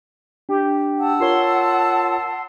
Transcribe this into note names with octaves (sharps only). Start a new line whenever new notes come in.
D4 G4
F#5 A5 E6
F4 A#4 C#5 C6